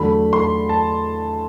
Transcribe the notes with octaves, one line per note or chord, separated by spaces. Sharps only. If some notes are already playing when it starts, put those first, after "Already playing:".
Already playing: E2 D3 F#3 A3 B5
C6
A5